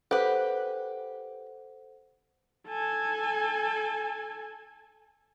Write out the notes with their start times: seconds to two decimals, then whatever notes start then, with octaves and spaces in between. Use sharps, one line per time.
0.11 G4 A4 B4 C5 F#5
2.68 A4 G#5